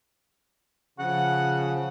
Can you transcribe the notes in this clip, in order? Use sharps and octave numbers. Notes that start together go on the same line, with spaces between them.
C#3 F3 F#5